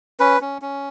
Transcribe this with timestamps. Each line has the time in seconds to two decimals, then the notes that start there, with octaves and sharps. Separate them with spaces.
0.20 C#4 B4
0.41 C#4
0.62 C#4